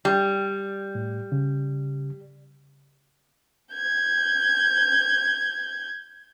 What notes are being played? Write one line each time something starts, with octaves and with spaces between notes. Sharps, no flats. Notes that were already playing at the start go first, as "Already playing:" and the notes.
G3
A2
C#3
G6 G#6